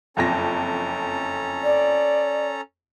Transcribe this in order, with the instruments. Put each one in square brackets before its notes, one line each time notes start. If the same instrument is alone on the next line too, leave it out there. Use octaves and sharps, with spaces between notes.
[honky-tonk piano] F#1 F2 A#6 [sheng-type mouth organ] C#4 A4 A#5
[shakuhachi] D5